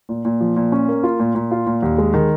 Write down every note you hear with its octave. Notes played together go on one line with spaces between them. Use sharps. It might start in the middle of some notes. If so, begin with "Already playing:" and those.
A#2
A#2
F3
A#2
C#4
A#3
F4
A#2
A#2
F4
A#2
D#2
G#3
D#3